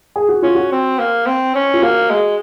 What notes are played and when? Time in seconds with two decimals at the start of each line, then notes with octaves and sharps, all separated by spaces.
0.16 G#4
0.29 F#4
0.42 C#4 F4
0.55 F#4
0.72 C4
0.99 A#3
1.26 C4
1.55 C#4
1.74 F4
1.82 A#3 F#4
2.10 G#3